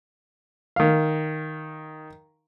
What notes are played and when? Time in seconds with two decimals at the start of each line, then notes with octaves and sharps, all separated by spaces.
0.76 D#3 F5